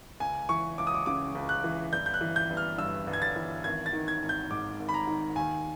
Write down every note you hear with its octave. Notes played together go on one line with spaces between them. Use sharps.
C#2 G#5
E3 C#6
C#2 D6
D#6
D6
C#3 D6
C#2
F#6
E3
G1 G6
G6
F#6
E3
G6
G1
F6
G2 E6
G1
G#6
A6
E3
G#1 G#6
A6
D#3
G#6
G#1
G6
G#2 D6
G#1
B5
A#5
D#3
D#2 G#5